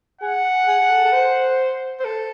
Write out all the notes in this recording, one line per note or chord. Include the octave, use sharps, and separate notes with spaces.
G#4 F#5
G#4
G#4
A4
A4
C5
C5
A4